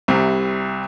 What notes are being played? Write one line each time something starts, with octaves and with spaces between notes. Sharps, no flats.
C2 C3 G3